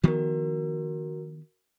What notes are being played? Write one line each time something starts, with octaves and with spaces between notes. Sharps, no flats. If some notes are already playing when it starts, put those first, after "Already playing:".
D#3 F3 B3 F#4 A#4